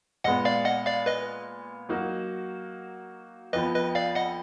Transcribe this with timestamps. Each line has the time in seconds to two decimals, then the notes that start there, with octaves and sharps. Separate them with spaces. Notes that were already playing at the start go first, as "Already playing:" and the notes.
0.24 A#2 G#3 B3 D#5 F#5
0.45 D5 F5
0.65 D#5 F#5
0.86 D5 F5
1.06 B4 D#5
1.89 F#3 A#3 D#4 F#4
3.53 F2 F3 B3 B4 D#5
3.74 B4 D#5
3.95 D5 F5
4.15 D#5 F#5